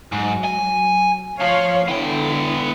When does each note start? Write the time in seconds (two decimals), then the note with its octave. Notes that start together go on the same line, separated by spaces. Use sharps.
0.12 G#2 F#3
0.45 G#5
1.40 F3 C#5 F5
1.88 D3 B3 E4 G5